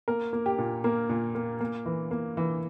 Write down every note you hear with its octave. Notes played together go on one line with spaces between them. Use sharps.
A#3 A#4
A#3
G4
A#2
A#3 A#4
A#2
A#3
A#3
E3
A#3
E3